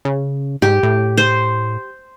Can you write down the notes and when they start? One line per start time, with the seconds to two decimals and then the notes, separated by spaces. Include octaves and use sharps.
0.05 C#3
0.62 G#2 G4
0.83 A2
1.17 C5